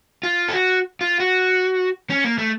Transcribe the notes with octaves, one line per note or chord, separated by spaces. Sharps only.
F4
A4
F#4
F4
F#4
C#4
A#3
A3